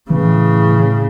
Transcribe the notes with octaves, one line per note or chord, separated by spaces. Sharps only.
A2 C#3 E3